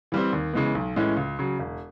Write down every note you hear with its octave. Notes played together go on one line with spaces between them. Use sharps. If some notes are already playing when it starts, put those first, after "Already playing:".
E3 G3 C4
D#2
C#3 E3 G#3 B3
B1
A2 E3 G#3 C#4
C#2
C#3 F#3
E1